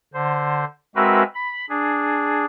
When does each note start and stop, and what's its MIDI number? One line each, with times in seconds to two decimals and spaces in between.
0.14 0.65 50
0.14 0.65 72
0.96 1.23 56
0.96 1.23 60
0.96 1.23 66
0.96 1.23 70
0.96 1.23 71
0.96 1.23 76
1.35 1.66 83
1.69 2.45 62
1.69 2.45 68